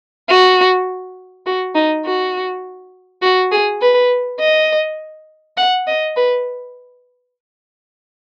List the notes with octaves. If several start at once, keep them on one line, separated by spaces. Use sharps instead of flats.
F#4
F#4
D#4
F#4
F#4
G#4
B4
D#5
F#5
D#5
B4